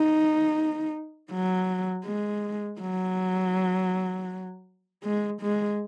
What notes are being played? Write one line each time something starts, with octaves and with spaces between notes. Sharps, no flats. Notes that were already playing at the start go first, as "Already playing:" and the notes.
Already playing: D#4
F#3
G#3
F#3
G#3
G#3